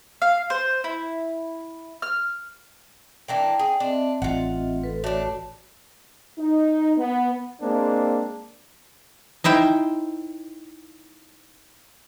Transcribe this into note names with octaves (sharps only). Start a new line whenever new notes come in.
F5
C5
E4
F6
E3 A#3 D4 G5
G#4 G5
C4 D4 D#5 E5
A1 F4 F#5
A4 B4
A3 D4 F#4 C#5 A5
D#4
B3
G#3 A#3 C4 D4
D#4 E4 C5 G5